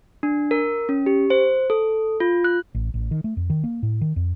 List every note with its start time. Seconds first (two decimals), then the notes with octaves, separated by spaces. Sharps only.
0.23 D4
0.51 A#4
0.89 C#4
1.06 G4
1.30 C5
1.70 A4
2.20 F4
2.44 F#6
2.74 A1
2.94 A1
3.11 D#3
3.24 A3
3.37 F2
3.50 D#3
3.64 A#3
3.83 A2
4.01 D#3
4.16 F2